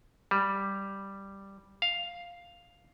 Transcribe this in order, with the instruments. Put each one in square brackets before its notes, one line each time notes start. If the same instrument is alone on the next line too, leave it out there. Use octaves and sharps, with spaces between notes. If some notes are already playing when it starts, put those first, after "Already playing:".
[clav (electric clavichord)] G3
F5